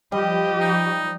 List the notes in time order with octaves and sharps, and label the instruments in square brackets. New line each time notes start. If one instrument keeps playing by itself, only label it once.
[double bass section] F3 [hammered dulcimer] G3 [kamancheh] G4 D#5
[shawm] D#4